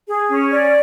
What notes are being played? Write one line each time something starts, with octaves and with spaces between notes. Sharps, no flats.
G#4
C#4
D5